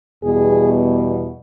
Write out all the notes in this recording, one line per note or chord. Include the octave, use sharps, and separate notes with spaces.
E2 B2 G3 G#4